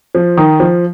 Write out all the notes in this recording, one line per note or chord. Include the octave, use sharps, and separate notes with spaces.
F3
D#3
F3